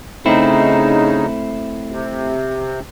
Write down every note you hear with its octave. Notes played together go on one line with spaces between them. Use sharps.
C#3 A3 C4 D#4 E4
C3